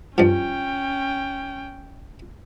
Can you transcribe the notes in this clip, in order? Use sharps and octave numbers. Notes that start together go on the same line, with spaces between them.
G2 F3 C#4 G5